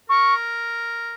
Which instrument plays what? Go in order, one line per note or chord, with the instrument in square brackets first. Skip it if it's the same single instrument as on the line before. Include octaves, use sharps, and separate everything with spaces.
[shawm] A#4 [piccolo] C#6